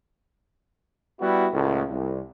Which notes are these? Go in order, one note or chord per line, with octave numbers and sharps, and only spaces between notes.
G3 B3 E4 F#4
C#2 A2
C2